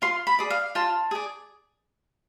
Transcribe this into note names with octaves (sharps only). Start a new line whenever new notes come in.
F4 C6
B5
G#4 D5
F5
F4 A5
G#4 D5